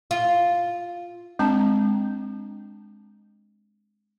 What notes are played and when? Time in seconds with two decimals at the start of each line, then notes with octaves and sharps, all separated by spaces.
0.11 F4
1.39 G#3 C4 D4 A5 A#5